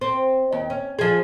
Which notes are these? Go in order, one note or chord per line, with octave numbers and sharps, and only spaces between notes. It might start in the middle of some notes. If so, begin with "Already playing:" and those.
C4
D#2
C#4
F3 G#4